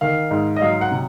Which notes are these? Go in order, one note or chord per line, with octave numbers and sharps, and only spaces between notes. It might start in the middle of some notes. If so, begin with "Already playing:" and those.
D#3 F5
G#2
D#5
F#3 F5
F#5
C3